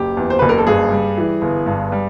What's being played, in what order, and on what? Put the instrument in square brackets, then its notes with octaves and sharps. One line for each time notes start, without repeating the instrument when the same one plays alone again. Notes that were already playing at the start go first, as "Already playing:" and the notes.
Already playing: [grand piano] F#1 G4
E2
C5
F#1 B4
A#4
A4
G2 G#4
G3
E3
G1
G2
G3